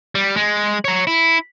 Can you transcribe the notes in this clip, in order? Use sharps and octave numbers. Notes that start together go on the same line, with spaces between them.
G3
G#3
C#5 A#5
E4